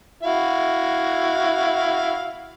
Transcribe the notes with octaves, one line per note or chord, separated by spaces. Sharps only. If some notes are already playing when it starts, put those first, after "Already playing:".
E4 F#4 F5